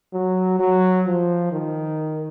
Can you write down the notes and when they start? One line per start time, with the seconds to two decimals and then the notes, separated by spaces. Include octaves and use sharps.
0.13 F#3
0.59 F#3
1.06 F3
1.52 D#3